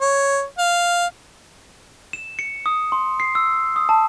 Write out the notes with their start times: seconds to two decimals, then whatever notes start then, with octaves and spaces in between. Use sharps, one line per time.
0.01 C#5
0.58 F5
2.13 E7
2.39 C#7
2.66 D#6
2.92 C6
3.20 C7
3.35 E6
3.76 D#6
3.89 A5